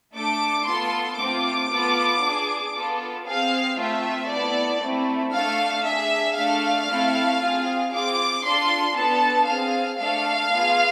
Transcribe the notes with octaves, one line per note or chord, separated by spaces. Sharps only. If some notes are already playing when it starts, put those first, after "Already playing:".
A3 D4 A4 D6
B3 F4 A4 C6
A3 C4 F4 D6
B3 F4 A4
D4 G#4
B3 F4 A4
C4 G#4 F5
A3 C4 F4 E5
B3 E4 A4 D5
A3 C4 E4
A3 D4 A4 F5
D4 G#4 E5
A3 D4 A4 F5
A3 C4 E4 A4
C4 F4 G#4
C4 F4 G#4 D6
D4 F4 A4 C6
B3 D4 A4 A5
C4 G#4 F5
A3 D4 A4 F5
B3 F4 G#4